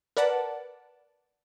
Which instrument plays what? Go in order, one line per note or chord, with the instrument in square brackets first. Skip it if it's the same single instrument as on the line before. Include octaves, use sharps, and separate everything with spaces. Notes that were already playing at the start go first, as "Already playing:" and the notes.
[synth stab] A#4 B4 D5 F#5 A5